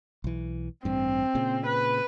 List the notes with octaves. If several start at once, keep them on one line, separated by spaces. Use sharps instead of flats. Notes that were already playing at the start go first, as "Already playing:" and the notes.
B1 E3
A1 G2 C4
A#2 C#3
B4